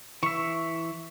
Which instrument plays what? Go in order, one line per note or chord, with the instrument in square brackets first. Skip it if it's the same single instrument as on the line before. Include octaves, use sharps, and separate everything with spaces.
[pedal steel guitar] E3 E5 [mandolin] C#6